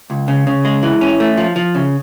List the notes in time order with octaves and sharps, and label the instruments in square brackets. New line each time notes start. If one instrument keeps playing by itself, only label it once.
[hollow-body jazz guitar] C#2
C#3
C#3
G#3
E3
C#4
A3
F3
F3
C#3